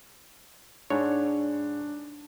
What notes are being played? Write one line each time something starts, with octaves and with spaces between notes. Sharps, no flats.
G#2 D4 C#5